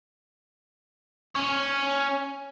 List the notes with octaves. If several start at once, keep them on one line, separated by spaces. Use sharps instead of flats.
C#4 C#5